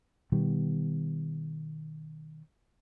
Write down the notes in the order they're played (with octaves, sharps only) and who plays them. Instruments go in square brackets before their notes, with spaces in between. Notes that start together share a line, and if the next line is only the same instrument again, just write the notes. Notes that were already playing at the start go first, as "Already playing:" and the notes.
[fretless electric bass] B2 D#3 G3 B3